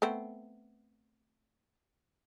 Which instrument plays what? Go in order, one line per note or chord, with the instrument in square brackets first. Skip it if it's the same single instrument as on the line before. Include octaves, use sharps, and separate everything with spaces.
[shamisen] A3 B3 C4